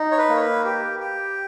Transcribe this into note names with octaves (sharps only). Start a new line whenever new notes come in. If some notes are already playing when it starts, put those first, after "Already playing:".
Already playing: D#4
C#5
B4
A#3
C#5
B4
G4
G4